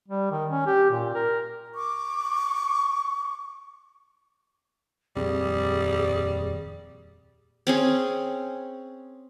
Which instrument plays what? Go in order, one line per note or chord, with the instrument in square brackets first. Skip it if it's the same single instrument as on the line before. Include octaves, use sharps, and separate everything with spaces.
[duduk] G3
D#3
C#4
G4
A#2
A#4
[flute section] C#6 D6
[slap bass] D#1 F2 C4 [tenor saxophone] G3 [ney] G#4
[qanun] C4 C#4 G#4